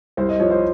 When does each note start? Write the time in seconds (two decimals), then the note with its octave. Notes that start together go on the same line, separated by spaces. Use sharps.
0.17 C2 C5
0.29 D#5
0.40 F3 C#5
0.51 C5